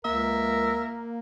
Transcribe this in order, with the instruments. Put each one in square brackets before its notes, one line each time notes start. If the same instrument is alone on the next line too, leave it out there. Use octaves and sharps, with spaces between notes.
[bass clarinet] C#2 [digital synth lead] A#3 [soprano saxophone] A#4 [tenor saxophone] E5